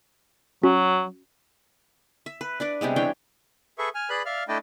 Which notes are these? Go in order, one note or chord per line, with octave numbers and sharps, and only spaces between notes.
F#3 C#4 F#4
E5
B4
D4 B4 D5
C3 G3 G#3 B3
E3 D4 C#5 G5
G#4 A4 B4 E5 C#6
G#5 F6
G#4 B4 D5 B5 F#6
D5 E5 F5 F6
A3 D4 E4 D5 D#5 G5